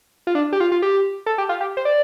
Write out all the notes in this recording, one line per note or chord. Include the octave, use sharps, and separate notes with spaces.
F4
D4
G4
F4
F4
G4
A4
G4
F4
G4
C5
D5